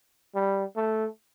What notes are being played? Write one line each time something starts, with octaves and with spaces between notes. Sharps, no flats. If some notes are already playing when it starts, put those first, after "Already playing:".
G3
A3